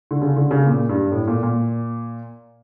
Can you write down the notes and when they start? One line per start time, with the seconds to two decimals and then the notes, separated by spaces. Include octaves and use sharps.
0.11 D3
0.21 C#3
0.36 D3
0.51 C#3
0.67 A#2
0.89 G2
1.12 A2
1.27 A#2
1.43 A#2